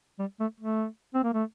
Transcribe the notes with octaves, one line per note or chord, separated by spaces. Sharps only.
G3
A3
A3
C4
A#3
A3